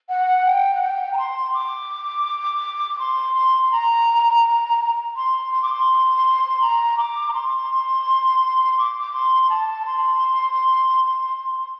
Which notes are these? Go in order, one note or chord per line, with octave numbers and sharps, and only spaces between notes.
F#5
G5
F#5
G5
A#5
C6
D6
C6
C6
C6
A#5
C6
C6
D6
C6
A#5
D6
A#5
C6
D6
D6
C6
A5
C6